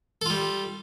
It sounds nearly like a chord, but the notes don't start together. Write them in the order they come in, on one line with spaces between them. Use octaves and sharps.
A4 F4 G3